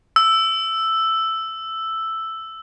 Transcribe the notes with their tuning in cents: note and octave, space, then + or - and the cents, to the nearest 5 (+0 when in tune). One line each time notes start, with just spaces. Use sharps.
E6 +5